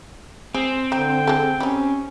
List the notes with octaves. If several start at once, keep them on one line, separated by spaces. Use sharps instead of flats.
C4 G#4
D3 D#4 G5
G#3 A4
G3 C#4 D#4